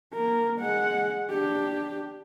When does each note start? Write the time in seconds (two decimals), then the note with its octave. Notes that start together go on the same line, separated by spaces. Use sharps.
0.13 A#3 A#4
0.59 G#3 F#5
1.30 D4 G4